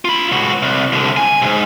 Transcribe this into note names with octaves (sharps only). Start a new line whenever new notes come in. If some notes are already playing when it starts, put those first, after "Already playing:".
F4 B5
C#2 F#4
C2
C2 D3
G#5
C2 G#2